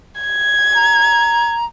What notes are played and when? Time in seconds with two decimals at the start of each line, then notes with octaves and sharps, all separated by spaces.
0.21 G#6
0.75 A#5